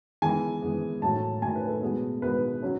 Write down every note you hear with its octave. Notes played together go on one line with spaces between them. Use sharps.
E3 G#3 B3 G#5
E3 G#3 B3
A2 F#3 A3 A5
A2 F#3 A3 G#5
B4
A4
B2 G#3 B3
B2 G#3 B3 B4
F#3 C#4